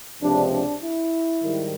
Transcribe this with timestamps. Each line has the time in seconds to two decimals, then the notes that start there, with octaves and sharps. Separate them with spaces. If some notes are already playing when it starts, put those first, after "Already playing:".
0.22 C#2 C3 F3 D4
0.52 D4
0.82 E4
1.42 G#2 D#3 G3